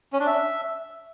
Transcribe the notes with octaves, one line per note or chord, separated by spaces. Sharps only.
C#4
D4
E5